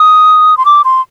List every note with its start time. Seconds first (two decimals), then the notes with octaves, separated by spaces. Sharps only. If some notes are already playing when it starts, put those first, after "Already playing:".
Already playing: D#6
0.57 C6
0.65 D6
0.84 C6